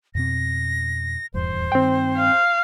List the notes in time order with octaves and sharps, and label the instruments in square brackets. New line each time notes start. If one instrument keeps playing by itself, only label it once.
[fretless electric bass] F2 B2 C4 [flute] A#6
[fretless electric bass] D#1 E2 G2 [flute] C5
[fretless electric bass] G2 D#3 [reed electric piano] C4 G5
[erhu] F5